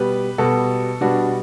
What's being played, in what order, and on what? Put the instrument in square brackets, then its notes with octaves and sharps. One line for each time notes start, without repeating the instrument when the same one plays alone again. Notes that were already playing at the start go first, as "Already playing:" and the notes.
Already playing: [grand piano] B2 G3 B3 G4 B4
B2 G3 B3 F#4 A4
B2 G3 B3 D4 F#4